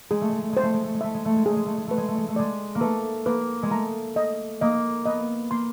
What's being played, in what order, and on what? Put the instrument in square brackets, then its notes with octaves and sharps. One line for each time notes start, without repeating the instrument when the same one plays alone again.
[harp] G#3 [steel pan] G#4
[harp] A3
G#3
A3
[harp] G#3 [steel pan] C5
[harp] A3
G#3
A3
G#3
[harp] A3 [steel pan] E5
[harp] G#3
A3
G#3
[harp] A3 [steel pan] G#4
[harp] G#3
A3
G#3
[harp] A3 [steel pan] B4
[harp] G#3
A3
G#3
A3
[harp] G#3 [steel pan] D5
[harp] A#3
[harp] A3 [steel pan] B4
[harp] A#3 [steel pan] B4
[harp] G#3
[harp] A3 [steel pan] A#5
[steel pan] D#5
[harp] A#3 [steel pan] D#5
[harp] B3 [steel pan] D#5
[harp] A#3 [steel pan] C6